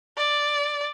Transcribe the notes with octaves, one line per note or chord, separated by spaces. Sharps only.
D5